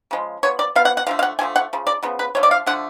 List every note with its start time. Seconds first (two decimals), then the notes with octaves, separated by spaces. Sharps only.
0.11 C#3 F3 G#3
0.43 F3 B3 C#5
0.59 D5
0.75 F3 B3 F5
0.85 F#5
0.97 F#5
1.07 D3 F3 A3 F5
1.19 F5
1.23 F#5
1.39 D3 F3 A3 G#5
1.56 F#5
1.73 C#3 F3
1.87 D5
2.03 C#3 F3 B3
2.19 B4
2.35 D3 F3 A3 C#5
2.43 D5
2.51 F5
2.66 D3 F3 A3 F#5